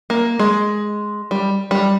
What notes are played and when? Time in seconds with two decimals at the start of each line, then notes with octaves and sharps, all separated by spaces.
0.10 A#3
0.39 G#3
1.31 G3
1.71 G3